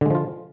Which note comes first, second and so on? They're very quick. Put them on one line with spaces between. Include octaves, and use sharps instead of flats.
D3 G#3 F3 F4